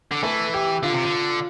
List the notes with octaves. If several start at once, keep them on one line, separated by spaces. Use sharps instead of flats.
D3
E3 A3 A4
G4 G5
D3 F4 F5
C3
D3